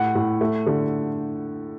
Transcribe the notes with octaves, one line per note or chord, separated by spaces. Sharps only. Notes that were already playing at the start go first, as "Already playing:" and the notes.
Already playing: A2 F#5
A2
A3
D3